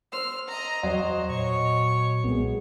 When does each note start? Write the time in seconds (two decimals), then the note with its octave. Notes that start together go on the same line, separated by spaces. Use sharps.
0.12 C5 E6 F6
0.49 D#5 A#5
0.83 E2 F#3 C5 D#5
1.29 A#2 C#5 C#6
2.24 B1 G#3 B3